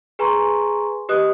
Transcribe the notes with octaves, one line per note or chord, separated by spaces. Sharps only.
G#4 B4 G#5 A#5 C6 C#6
G4 B4 D#5 D#6 F#6